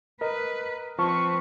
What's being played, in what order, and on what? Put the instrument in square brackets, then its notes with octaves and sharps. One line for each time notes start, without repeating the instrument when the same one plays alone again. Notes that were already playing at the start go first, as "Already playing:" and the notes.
[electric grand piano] A#4 D#5 [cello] B4
[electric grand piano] F3 A5 F6 [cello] C4 B4 [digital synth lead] C#6